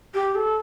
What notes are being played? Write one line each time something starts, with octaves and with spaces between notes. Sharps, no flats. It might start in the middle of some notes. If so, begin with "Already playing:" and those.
G4
A4